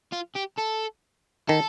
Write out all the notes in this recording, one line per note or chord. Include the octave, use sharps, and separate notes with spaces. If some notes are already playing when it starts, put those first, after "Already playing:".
F4
G4
A4
D#3 A4